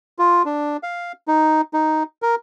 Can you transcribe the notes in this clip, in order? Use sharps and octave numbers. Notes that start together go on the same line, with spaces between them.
F4
D4
F5
D#4
D#4
A#4